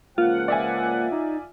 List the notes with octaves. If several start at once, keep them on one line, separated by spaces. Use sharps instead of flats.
C#2 F3 A#3 F4 F#5
D5 E5 G#5
D#4